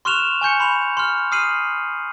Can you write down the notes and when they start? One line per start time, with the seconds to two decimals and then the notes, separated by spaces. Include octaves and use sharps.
0.05 C6 C#6 F6 F#6 E7 F7
0.41 G#5 C#6 G6 C#7
0.60 B5 C6 F7
0.97 C6 F6
1.32 D#6 F6 C7 D#7 F#7